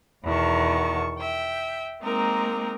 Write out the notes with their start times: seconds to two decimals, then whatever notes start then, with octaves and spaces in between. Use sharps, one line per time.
0.24 E2 B2 D#3 A5 C#6
1.18 E5 G5
2.03 G#3 A#3 C4 D#4 A#4